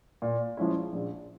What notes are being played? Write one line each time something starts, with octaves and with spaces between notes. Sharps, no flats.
A#2
F3 G#3 C#4 E4
A#1